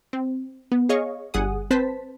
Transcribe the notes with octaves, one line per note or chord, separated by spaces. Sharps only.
C4
B3
G#4 C#5 D#5 F5 C#6
G1 G3 G#4 F#5 G#5 D#6
C4 B4 C5 A5 B6